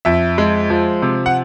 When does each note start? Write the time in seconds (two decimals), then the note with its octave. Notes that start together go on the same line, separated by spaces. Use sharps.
0.05 F2 E5
0.38 G#3
0.70 F3
1.02 C3
1.26 F#5